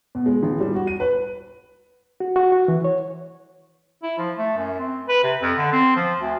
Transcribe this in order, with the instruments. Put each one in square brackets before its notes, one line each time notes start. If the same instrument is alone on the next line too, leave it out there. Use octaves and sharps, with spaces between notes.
[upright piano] B2
G#3
A1
G3
F#4
D#7
B4
[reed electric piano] F#4
F#4
F#4
E3
C#5
[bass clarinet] E4
F3
A3
F#2
C4
B4
C3
F2
D3
C4
F3
D2